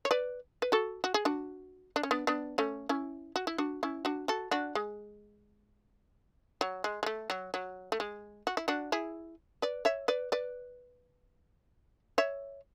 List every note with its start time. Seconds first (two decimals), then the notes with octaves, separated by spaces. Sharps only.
0.05 C#5
0.11 B4 D5
0.62 B4
0.72 F#4 A4
1.04 F#4
1.14 G#4
1.25 D4 F#4
1.96 D4
2.03 C#4
2.11 B3 D4
2.27 B3 D4
2.58 A3 C#4
2.89 C#4 E4
3.36 F#4
3.47 E4
3.58 D4 F#4
3.83 C#4 E4
4.05 D4 F#4
4.28 F#4 A4
4.51 D4 F#4
4.75 G#3
6.61 F#3
6.84 G#3
7.03 G#3
7.06 A3
7.30 F#3
7.54 F#3
7.92 A3
8.00 G#3
8.47 F#4
8.57 E4
8.68 D4 F#4
8.92 E4 G#4
9.62 B4 D5
9.85 C#5 E5
10.08 B4 D5
10.32 B4 D5
12.18 C#5 E5